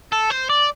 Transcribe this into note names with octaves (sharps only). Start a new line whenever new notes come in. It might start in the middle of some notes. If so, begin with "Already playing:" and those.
A4
C5
D5